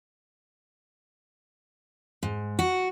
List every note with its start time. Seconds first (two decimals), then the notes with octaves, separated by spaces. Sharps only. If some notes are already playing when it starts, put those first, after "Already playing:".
2.23 G#2
2.59 F#4